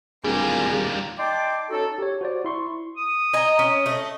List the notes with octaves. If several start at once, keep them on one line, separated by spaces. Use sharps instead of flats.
D1 D#2 G3 D4 F4 G#4 A#4
D#4 D5 G5 A5 C6 D6
C#4 D#4 F#4 A4
G4 C#5
F#4 C5 D5
E4 C6 C#6
D#6
D#5 G#5 A#5
C#4
A3 D#5